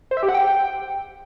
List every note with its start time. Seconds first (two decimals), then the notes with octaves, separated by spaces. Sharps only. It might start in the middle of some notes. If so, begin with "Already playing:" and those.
0.11 C5
0.17 E5
0.23 G4
0.29 F#5
0.34 G5